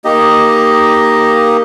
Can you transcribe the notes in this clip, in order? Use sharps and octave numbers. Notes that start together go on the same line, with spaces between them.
A#3 D#4 G4 D#5